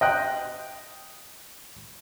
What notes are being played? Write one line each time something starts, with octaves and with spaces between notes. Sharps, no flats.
D#5 G5 F#6